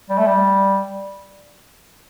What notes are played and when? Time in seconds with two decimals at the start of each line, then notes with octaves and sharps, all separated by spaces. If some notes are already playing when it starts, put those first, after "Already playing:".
0.10 G3
0.18 A3
0.27 G3